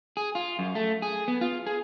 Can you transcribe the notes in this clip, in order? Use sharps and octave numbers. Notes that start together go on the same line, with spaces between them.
G#4
F4
F#2
A3
G#4
B3
F4
G#4